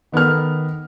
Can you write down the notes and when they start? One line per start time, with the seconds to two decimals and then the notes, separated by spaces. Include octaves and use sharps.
0.12 D#3 B3 A4 A#4 F6